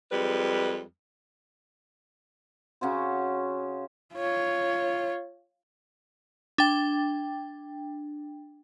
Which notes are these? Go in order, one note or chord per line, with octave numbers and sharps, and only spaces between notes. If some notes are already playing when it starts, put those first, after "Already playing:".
F2 G3 G#3 B4
C#3 C#4 F#4 C5
F4 C#5
D4 G5